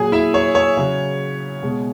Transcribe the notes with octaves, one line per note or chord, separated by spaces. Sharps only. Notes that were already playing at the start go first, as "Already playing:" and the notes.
Already playing: A#2 F#3 G#4 G#5
E4 E5
C#5
C#5
C#3 F#3
B2 G#3